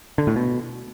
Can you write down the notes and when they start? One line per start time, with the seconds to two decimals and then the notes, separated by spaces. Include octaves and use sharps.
0.18 D3
0.27 A2
0.36 B2